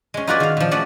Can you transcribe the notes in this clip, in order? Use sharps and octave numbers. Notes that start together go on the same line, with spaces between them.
G#3 C#4
D#4 F4 F#4 G#4 B4 D5
D#3 F5
A#2 F3
A3 C#4 F#4 D5